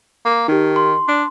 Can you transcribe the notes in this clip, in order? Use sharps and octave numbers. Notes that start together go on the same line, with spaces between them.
A#3
D#3 D#4 G4
C6
D4